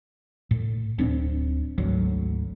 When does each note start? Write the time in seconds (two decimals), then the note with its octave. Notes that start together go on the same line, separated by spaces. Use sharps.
0.51 A2
0.98 D1 C4 D4
1.78 G#1 D2 F#3